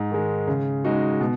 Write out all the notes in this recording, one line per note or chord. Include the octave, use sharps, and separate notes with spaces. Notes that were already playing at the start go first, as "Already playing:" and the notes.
Already playing: G#2
D#3 G#3
C#3
G#3 D#4 F#4
B2